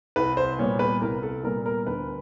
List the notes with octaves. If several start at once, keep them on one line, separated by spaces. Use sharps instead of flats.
C2 B4
C5
A#2 G3 B3 C#5
B4
C2 A#4
A4
A#2 G3 B3 A#4
A#4
D2 B4